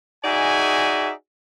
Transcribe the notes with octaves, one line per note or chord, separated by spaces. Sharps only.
D#4 F#4 G#4 D5 E5 G#5